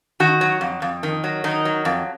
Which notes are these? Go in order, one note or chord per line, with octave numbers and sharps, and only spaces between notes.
D#3 F#4
F#3
F2
F2
D#3
F#3
D#3 D#4
F#3
F2